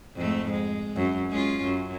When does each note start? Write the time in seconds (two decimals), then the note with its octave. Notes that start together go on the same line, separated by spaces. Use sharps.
0.16 F2 G#2 A3
0.51 G#3
0.96 F#2
1.30 G#3 C#4 F4
1.64 F#2